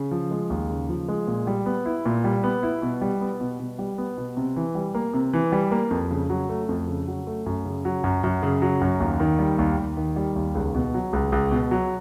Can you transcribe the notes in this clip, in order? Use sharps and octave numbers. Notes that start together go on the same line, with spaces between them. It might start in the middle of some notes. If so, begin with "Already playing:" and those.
Already playing: C#3
F3
G#3
D#2
C#3
F3
G#3
A#2
G3
B3
E4
A#2
G3
B3
E4
B2
G3
B3
B2
B2
G3
B3
B2
C3
E3
G3
A#3
C3
E3
G3
A#3
F2
C#3
F#3
A3
F2
C#3
F#3
A3
F#2
C#3
F#3
F#2
F#2
C#3
F#3
F#2
D#2
D#3
G3
D#2
D#2
D#3
G3
D#2
C#2
B2
F#3
C#2
C#2
B2
F#3